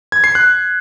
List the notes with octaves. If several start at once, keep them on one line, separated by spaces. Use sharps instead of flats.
G#6
C7
F#6